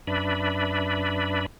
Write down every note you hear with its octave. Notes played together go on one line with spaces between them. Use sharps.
F#2 D4 B4 D5 E5 B5